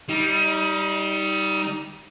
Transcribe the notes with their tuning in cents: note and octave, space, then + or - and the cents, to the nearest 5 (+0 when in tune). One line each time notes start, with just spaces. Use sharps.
G3 -10 D#4 +25